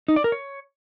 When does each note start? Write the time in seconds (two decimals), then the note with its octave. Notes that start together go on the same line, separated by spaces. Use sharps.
0.08 D#4
0.16 D5
0.24 A#4
0.32 C#5